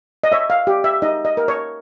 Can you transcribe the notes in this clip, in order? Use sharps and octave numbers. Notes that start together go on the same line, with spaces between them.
D#5
C#5 E5
F5
G4
E5
D#4 D#5
D#5
A#4
C#5